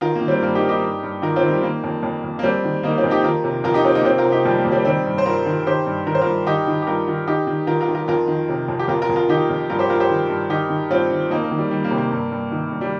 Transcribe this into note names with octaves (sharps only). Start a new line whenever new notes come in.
D#3 F4 A#4
A#3
D#3
G3 C4
G2 A#3
D#4 G4
G2
D#4 G4
G2
G2
D#3 F4 A#4
C4 F4
D#3
G3
D#3 A#3
F2
F2
F2
A#3
F2 G3 C4
D#3
D#3 A#3 D#4
C4 F4
F2
D#4 G4
D#3 F4 A#4
C3
F2 F4 A#4
D#4 G4
C3 C4 F4
A#3 D#4
C3 C4 F4
F4 A#4
C3
D#4 G4
F2 G3
A#3
F2
G3 C4
D#3 G3 C4
G2
C5
G2 F4 A#4
D#3
D#3 G4 C5
G2
D#3 A#4
C5
F4 A#4
G2
D#3 D#4 G4
D#3
G4
G2 F4 A#4
D#3
D#3 D#4 G4
D#3
D#3 F4 A#4
F4 A#4
D#3
F4 A#4
F2 F4 A#4
D#3
C3
F2
G4
F2 F4 A#4
F4 A#4
F2
F4 A#4
D#3 D#4 G4
F2
G2 F4 A#4
G4 C5
G2 F4 A#4
G4 C5
D#3
G2
D#3 D#4 G4
D#3
G2 C4 F4
D#3
F2 A#3 D#4
A#3
D#3
G3
D#3 G3
A#3
C3
A#3
G2
G2
D#3
G2
G3